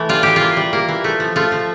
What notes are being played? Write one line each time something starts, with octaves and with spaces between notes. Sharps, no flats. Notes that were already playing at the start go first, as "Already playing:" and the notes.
Already playing: E3 A3
G3 F4
E3 G4
A#3 F4
G3
A#3
E3
A3
F3
A3 F4
F3